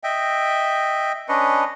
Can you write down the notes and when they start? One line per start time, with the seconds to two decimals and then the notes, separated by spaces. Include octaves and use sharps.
0.04 D#5 E5 G5
1.29 C#4 D4 B4 D#5